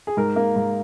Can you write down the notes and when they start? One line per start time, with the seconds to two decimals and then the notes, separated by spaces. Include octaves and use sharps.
0.07 G#4
0.17 G#2 A#4
0.36 A#3
0.56 G#2